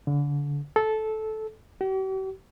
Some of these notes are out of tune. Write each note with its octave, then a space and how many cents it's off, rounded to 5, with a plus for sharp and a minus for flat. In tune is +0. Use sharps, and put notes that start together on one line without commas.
D3 -30
A4 -15
G4 -45